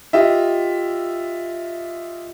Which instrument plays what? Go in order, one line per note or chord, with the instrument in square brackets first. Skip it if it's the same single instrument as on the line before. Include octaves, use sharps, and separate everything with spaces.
[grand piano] F4 G4 D#5 E5